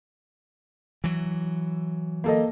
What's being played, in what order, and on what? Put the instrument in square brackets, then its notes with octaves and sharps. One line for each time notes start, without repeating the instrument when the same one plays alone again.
[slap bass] E3 F#3
[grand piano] A#3 A4 D#5